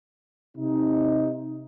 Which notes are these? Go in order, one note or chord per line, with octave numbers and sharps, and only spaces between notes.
C3 D#4